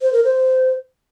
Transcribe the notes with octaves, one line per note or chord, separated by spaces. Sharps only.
C5
A#4
C5